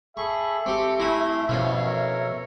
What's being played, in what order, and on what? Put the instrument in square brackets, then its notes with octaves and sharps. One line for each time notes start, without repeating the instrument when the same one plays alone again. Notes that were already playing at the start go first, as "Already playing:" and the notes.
[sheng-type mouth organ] G#4 A4 B5 [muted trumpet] E5 [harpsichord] C#6
[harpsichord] C4 G4 [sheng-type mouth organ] A4 C#6 D6
[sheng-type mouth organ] A3 C6 [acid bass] E4 [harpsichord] G#5 A#5
[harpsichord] F2 C#4 E4 [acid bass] B2 [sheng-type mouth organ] F5
[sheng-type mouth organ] A#4 C#5